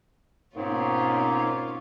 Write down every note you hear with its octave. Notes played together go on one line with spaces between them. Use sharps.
G#2 B2 A#3 C4 C#4 F4 C#5